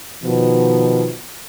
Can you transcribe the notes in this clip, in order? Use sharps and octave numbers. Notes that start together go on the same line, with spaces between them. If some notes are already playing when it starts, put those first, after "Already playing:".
B2 D#3 F3